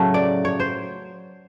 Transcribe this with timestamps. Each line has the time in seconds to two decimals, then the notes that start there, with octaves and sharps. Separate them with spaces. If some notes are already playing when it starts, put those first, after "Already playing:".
Already playing: A2 C#3 F#3 A3
0.14 D5
0.45 C#5
0.60 C5